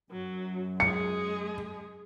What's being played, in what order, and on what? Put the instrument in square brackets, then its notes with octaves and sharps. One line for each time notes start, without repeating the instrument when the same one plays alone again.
[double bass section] F#2 [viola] F#3
[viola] G#3 G#4 [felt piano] C#7